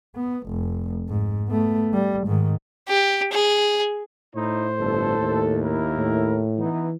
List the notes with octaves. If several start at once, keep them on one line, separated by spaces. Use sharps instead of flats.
B3
F1
G#2
A3 B3
G3
G#2 D#3
G4
G#4
A2 D#4 E4 C5
G1 A4
D#2
A#3 E4 A#4
A2
E3 B3 D#4